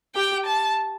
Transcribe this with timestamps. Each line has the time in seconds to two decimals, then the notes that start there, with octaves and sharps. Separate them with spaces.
0.15 G4 G5
0.46 A5